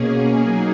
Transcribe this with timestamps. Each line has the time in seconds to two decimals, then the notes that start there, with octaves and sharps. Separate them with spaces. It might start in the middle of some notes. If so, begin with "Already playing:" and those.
Already playing: B2 A#3 C#4 G#4
0.41 F#3 A#3 D#4 G#4